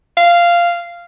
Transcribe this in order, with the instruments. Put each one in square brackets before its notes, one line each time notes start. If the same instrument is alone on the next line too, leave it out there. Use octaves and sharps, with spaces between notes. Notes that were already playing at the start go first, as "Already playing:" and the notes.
[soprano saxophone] F5